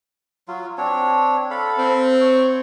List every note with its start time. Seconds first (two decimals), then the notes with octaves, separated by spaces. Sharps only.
0.48 F#3 F4
0.78 C4 D4 C#5
1.51 A4 F5 B5
1.78 C4
2.21 C#5 C#6